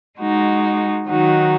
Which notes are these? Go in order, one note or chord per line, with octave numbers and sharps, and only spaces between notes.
G#3 D#4 F#4
D#3 F#3 D#4 F#4